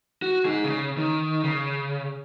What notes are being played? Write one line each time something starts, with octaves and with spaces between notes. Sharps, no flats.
F#4
D#4 G#4
C#3
D#3
C#3